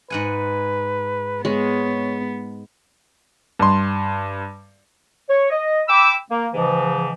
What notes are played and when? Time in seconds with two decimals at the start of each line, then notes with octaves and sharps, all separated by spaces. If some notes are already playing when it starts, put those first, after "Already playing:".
0.10 G#2 B4 F#5 G#5
1.45 G#3 B3 C#5
3.59 G2 C6
5.28 C#5
5.50 D#5
5.88 G5 B5 D6 E6
6.29 A#3
6.53 G#2 C#3 E3 F3